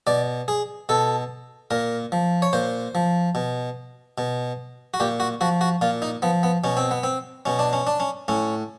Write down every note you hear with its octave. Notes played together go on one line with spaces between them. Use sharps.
B2 D5
G#4
B2 A4
A#2 A#4
F3
C#5
A#2 C5
F3
B2
B2
F#4
A#2 G4
F#4
F3 F#4
F#4
A#2 F4
D#4
F3 B3
B3
B2 C#4
C4
B3
C4
B2 C#4
D4
C#4
D4
C#4
A2 C#4